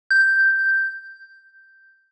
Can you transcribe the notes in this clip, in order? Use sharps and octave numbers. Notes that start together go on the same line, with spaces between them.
G6